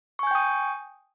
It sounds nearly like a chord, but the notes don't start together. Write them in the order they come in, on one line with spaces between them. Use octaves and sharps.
C#6 G#5 G6 G5 D#6